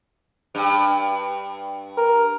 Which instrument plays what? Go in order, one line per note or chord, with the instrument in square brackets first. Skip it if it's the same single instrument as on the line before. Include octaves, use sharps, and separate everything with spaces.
[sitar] G2
[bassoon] A#4